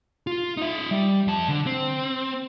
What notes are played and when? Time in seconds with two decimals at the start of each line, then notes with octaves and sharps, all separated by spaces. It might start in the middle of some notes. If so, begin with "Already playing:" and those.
0.27 F4
0.57 D#4 E5
0.91 G3
1.27 F2 A5
1.49 D3
1.67 C4